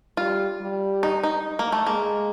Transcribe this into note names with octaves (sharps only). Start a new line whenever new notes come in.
G3 F4
G3
D#4
D#4
A#3
A3
G#3 A#3